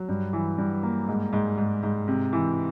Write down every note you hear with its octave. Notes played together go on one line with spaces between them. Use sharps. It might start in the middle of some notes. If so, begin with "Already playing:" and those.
Already playing: F#3
G2
E3
G2
A#3
G#2
G#2
G#2
G#2
C3
E3